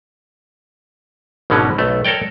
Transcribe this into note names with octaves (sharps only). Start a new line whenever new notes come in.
G#1 B2 D3 F#3 C#4
B1 A3
A4 A#4 C#5 D5 G5